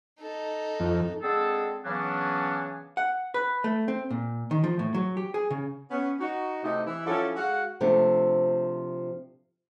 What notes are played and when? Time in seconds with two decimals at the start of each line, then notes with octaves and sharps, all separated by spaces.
0.20 D#4 A4
0.80 F2
1.22 D3 G#3 C4 G#4 A4
1.85 C#3 E3 F#3 B3 C#4 D4
2.97 F#5
3.34 B4
3.64 A3
3.88 C4
4.11 A#2
4.51 D#3
4.64 F3
4.79 A2
4.94 F#3
5.17 G4
5.34 G#4
5.51 C#3
5.91 B3 C#4
6.20 D#4 F#4
6.63 A2 C3 D#4
6.87 E3 E4
7.06 F3 F#3 C#4 D4 E4 A4
7.37 G#3 F#4 F5 F#5
7.81 C3 F3 A3 D4